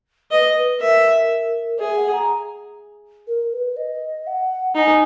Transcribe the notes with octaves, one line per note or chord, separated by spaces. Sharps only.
B4 D#5
B4
A#4 E5
G#4 E5
F#5
A#5
A#4
B4
D#5
F#5
D#4 G#5 A#5